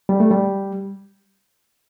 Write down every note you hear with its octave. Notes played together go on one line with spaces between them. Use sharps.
G3
A3
G3